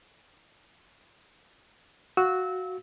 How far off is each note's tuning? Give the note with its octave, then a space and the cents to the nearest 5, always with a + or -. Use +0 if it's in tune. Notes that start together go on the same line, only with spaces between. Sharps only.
F#4 +0 F5 +0 E6 -25